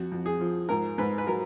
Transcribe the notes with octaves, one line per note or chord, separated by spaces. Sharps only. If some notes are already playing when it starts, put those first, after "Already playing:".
Already playing: F2 F#4
F2
G#4
F3
G#2 A#4
G#2 B4
B4
F#3 A#4